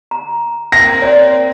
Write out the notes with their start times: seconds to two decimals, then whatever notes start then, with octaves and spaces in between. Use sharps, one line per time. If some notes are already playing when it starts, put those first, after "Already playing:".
0.11 A#5
0.72 A#3 C4 A#6
1.02 C#5 D5